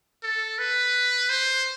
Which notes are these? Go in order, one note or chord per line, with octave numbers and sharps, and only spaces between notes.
A4
B4
C5